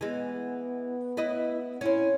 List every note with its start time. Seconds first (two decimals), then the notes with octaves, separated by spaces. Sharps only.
0.01 E3 G#3 B3
1.17 E4 B4 D#5
1.81 C4 C#4 E4